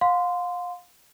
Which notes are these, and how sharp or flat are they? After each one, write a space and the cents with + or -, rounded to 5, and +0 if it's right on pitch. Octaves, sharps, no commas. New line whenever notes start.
F5 +30 C6 -15